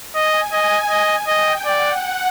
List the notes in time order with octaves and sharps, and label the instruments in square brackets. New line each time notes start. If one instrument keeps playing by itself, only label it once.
[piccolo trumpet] D#5 [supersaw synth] G#5
[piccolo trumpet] D#5
D#5
[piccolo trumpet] D#5 [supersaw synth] G5
[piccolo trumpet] D5 [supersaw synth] F#5